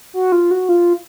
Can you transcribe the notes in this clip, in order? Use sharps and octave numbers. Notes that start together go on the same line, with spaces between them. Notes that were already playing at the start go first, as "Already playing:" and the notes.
F#4
F4
F#4
F4